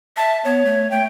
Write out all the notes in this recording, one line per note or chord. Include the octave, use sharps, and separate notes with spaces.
E5 A5
B3 C#5
A3
A3 G5